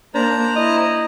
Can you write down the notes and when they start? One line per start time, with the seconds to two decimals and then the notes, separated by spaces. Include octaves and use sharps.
0.15 A#3 D4 C5 A#5
0.56 E4 D#5